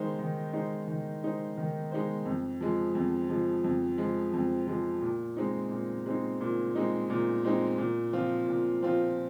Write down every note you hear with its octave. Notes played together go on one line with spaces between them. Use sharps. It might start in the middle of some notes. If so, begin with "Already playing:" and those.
Already playing: D#3 G#3 D#4 C5
D#3
G#3 D#4 C5
D#3
G#3 D#4 C5
D#3
G#3 D#4 C5
F2
F3 G#3
F2
F3 G#3
F2
F3 G#3
F2
F3 G#3
A#2
G#3 C4 D#4
A#2
G#3 C4 D#4
A#2
G#3 C4 D#4
A#2
G#3 C4 D#4
A#2
F3 C4 F4
A#2
F3 C4 F4